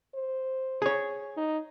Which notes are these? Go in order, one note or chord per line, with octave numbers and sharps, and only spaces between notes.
C5
G#4 C#5
D#4